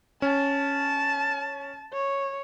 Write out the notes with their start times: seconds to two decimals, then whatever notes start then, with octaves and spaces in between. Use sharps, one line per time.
0.22 C#4 A5
1.93 C#5